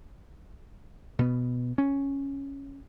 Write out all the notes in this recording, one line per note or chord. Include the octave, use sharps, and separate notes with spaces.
B2 B3
C#4